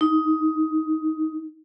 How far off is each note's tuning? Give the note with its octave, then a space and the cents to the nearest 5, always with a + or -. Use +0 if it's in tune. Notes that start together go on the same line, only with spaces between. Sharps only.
D#4 +15